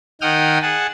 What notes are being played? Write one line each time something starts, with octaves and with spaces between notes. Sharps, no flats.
D#3 F#5 G5 D#6 F6
G#4 F#5 A5